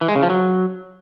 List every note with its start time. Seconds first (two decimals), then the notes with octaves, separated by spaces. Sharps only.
0.01 E3
0.08 G#3
0.16 C#3
0.23 F3
0.30 F#3